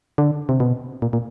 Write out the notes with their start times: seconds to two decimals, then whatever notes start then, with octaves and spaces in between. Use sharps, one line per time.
0.18 D3
0.49 C3
0.60 B2
1.02 A#2
1.13 A#2